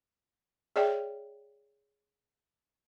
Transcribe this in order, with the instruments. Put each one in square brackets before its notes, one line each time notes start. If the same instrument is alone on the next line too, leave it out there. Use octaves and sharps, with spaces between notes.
[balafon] G#4 C#5 D5 E5 G5